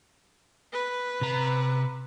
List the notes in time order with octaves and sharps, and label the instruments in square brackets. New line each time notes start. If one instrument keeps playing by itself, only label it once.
[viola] B4
[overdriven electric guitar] C3 A#5